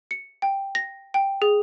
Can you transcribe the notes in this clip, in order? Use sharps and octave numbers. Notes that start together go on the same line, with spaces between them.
C#7
G5
A#6
G5
G#4